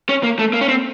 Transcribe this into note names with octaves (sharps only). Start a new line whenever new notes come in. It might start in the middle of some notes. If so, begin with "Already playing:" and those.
C#4
A#3
A3
A#3
C#4
C4